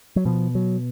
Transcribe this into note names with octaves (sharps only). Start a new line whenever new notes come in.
F#3
B2 F3
F#3